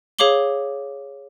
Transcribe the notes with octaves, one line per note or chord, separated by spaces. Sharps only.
G#4 C#5 F5 D6 F#7 G7